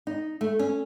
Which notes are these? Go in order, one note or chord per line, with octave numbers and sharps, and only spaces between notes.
D#4
A3
C#4